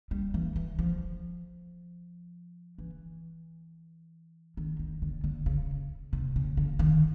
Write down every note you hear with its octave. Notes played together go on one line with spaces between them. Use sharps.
G3
E3
E3
F3
E3
D#3
D#3
D3
D3
C#3
C3
C#3
D3
D#3